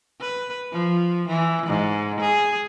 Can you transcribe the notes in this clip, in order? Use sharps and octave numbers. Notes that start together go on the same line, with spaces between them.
B4
F3
E3
G#2
G#4